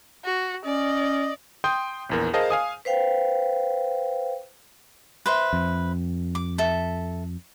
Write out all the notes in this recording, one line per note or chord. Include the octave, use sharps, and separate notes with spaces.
F#4
C#4 D5 D#5
G5 C6 D#6 G6
A#1 E2 A#4
G#4 A#4 C5 D#5 F5 A5
F5 G#5 D#6
B4 C5 F5 G5
B4 C5 E5
F2
D6
A4 E5